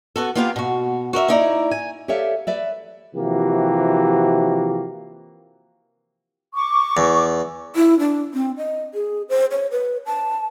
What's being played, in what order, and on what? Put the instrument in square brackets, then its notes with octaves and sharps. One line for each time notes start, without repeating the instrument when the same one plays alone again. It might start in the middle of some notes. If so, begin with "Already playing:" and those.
[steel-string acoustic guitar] B3 F#4 A4
A#3 B3 F4 G4 C5 F5
B2 F#4
F#4 A#4 D#5 E5
A#3 D#4 E4 D5 A#5
G#5
[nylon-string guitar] G4 A4 C#5 D5 E5 F5
B4 D5 E5
[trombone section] C3 E3 F3 A#3 F#4 G4
[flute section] C#6 D6
[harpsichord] E2
[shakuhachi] E4
D4
C4
D#5
G#4
C5
C#5
B4
A5